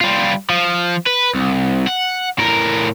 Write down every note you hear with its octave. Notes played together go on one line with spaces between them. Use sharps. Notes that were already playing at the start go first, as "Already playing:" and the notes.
G3 F4
F3
B4
C2
F#5
A2 A#4